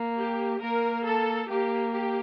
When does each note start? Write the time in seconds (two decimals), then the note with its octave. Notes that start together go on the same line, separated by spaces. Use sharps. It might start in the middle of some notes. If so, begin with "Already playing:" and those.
Already playing: A#3
0.17 G4
0.61 A#3 A#4
1.05 A4
1.47 A#3 G4
1.91 G4